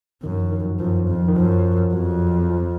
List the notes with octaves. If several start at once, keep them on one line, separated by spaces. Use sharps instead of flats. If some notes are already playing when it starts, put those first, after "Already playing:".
F#2 D#3
F3
D#3
F#3
F#2 F3
F2
D#3
F#2 F3
F2 F#3
F3